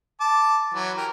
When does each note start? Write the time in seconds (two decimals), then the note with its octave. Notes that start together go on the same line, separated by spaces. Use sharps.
0.20 A5 D6
0.74 E3 F#3
0.97 G4 A#4